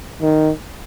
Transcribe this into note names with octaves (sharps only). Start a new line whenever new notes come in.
D#3